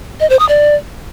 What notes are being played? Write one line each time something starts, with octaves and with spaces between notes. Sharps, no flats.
D#5
C5
D#6
D5